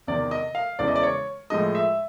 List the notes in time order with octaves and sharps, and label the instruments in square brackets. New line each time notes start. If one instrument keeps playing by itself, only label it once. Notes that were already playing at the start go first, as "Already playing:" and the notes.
[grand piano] E2 C3 D#3 D5
D#5
F5
E2 C#3 E3 G#3 D5
D#5
D5
C#5
A2 F3 G#3 D#5
E5